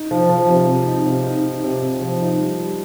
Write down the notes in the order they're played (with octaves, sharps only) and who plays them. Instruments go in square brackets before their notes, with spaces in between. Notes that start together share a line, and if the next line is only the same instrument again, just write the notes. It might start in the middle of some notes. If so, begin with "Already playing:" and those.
Already playing: [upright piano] D#4
F3
F3
C3
C3
D#4
C3
D#4
D#4
C3
C3
F3
D#4
G3
G3